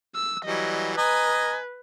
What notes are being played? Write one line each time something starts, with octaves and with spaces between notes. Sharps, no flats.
E6
E3 F#3 G3 D#5
B4 D#5 G#5 A#5